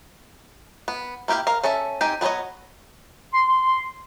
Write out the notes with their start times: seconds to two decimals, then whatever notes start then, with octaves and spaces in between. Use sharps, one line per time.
0.88 B3
1.28 A#3 E4 G4 F5 G5
1.47 A#4 F5
1.63 C#4 A4 E5 A5
2.01 C4 D#4 G4 G#5
2.21 F#3 B3 E4 C#5 D#5
3.34 C6